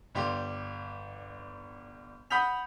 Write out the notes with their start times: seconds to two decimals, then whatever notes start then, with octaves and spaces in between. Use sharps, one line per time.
0.15 G1 G3 G4 C6
2.30 F#5 B5 D#6 G6 B6 F7